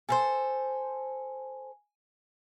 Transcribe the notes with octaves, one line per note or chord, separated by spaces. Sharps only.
A4 A#4 C5 G#5